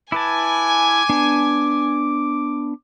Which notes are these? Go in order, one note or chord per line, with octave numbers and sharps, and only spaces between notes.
E4 B4 G#5 A5 D6
B3 D4